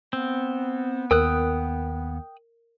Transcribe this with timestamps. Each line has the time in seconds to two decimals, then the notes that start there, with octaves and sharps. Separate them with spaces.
0.13 B3 C4
1.11 D#2 A#4 G5 D#6 F#6